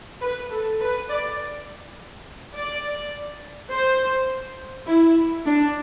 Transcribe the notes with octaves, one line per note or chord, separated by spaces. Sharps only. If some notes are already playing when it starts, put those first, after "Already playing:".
B4
A4
B4
D5
D5
C5
E4
D4